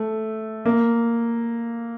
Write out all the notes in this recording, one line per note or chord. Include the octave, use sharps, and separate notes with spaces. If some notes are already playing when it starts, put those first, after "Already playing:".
Already playing: A3
A#3